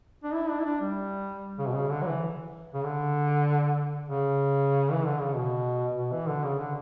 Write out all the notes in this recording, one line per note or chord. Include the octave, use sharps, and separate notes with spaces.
D4
E4
D4
E4
D4
G3
C#3
B2
C#3
D3
F#3
E3
C#3
D3
C#3
E3
D3
C#3
B2
B2
E3
D3
C#3
D3